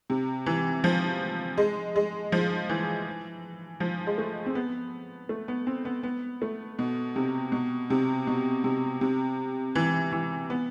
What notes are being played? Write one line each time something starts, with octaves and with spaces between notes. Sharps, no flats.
C3
E3
F3
G#3
G#3
F3
E3
F3
G#3
A3
C4
B3
A3
B3
C4
B3
B3
A3
B2
C3
B2
C3
B2
C3
C3
E3
E3
B3